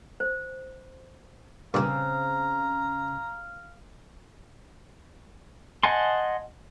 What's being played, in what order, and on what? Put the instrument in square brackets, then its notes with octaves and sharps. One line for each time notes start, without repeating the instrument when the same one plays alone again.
[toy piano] C5
[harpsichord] G2 A#2 [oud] C#3 C4 [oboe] F5 [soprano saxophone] A#5
[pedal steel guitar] D#5 F#5 G#5 A5 C6